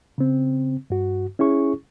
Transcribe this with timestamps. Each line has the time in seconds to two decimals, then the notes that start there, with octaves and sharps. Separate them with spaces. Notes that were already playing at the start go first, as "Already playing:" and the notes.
0.18 C#3 C4
0.90 G2 F#4
1.39 C#4 E4 G#4 C#6